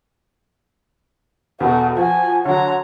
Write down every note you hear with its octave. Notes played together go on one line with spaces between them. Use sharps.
E2 B2 F#4 A4
F3 F#4 G#5
D3 F#3 C#5 A#5